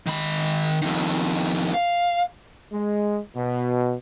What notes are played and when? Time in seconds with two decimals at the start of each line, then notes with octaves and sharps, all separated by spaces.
0.06 D#3 B5
0.82 F2 D#3
1.74 F5
2.72 G#3
3.35 B2